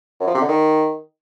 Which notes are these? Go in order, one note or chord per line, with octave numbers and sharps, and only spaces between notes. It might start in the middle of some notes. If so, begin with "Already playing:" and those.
F#2
F3
C3
D3
D#3